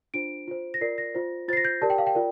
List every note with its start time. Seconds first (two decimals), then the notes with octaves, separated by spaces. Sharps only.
0.14 D4 F4 C5 D7
0.48 F4 C5
0.74 A#6
0.81 F4 A#4 D5 C7
0.98 A#6
1.15 F4 C5
1.48 F4 C5 A6 C7
1.57 A#6
1.65 G6
1.82 G4 A#4 D5 A5
1.90 G5
1.98 F5
2.07 G5
2.15 F4 A#4 D5